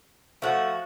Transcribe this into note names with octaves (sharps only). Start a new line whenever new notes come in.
F3 A3 F#4